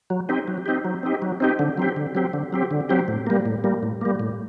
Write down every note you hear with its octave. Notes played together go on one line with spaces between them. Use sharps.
F#3
C4 D#4 G4
F#3
C4 D#4 G4
F#3
C4 D#4 G4
F#3
C4 D#4 G4
D3
F#3 C4 G4
D3
F#3 C4 G4
D3
F#3 C4 G4
D3
F#3 C4 G4
A2
G3 A#3
A2
G3 A#3
A2
G3 A#3
A2